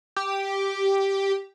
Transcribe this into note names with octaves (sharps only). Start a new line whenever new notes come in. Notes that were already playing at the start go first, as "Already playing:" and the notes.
G4